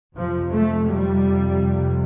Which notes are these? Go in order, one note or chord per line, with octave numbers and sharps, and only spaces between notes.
F2 C3 F3
A3
G3